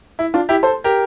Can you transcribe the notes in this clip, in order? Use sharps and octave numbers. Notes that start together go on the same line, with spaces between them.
E4
D4 F4
E4 G4
A4 C5
G4 A#4